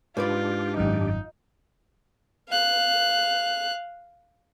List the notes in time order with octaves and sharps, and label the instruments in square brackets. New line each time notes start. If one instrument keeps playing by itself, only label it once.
[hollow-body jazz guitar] G#2 B4 D5 [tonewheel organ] D4 G4 [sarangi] F4
[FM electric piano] G#1 F#2 [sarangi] D#4
[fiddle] F5 F#6